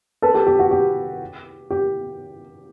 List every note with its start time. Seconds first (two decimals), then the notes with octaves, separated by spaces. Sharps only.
0.22 A4 B4
0.34 G4 A4
0.47 G4
0.59 F#4
0.71 G4
1.70 G4